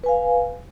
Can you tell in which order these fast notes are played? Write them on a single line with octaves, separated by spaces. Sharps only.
B4 G#5 F5